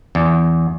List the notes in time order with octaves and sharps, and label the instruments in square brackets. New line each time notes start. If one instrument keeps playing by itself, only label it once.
[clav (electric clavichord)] E2